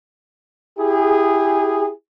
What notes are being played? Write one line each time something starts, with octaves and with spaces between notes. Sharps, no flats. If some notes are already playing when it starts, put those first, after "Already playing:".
E4 G4 G#4